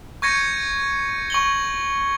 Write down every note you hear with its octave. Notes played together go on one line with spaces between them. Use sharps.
C#6 G6 G#6 A#6 C#7 D#7
C#6 F#7 G7